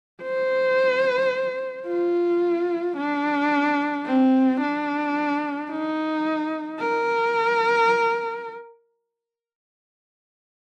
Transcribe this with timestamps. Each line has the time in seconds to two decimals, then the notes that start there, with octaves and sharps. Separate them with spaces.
0.23 C5
1.87 F4
2.97 D4
4.06 C4
4.61 D4
5.70 D#4
6.80 A#4